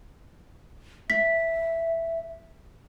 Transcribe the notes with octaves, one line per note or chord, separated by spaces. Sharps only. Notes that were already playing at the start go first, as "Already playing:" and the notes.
E5 B6